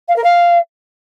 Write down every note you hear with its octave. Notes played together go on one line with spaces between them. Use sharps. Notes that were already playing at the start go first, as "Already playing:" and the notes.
F5
A#4
F5